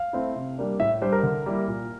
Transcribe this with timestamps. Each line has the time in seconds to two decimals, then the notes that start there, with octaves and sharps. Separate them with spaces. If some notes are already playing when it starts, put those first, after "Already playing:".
Already playing: F5
0.13 A3 C4 E4
0.36 C3
0.58 G3 A#3 D4
0.80 A2 E5
1.01 G3 D4 C5
1.12 A#4
1.23 D3
1.46 G3 A#3 E4
1.68 A#2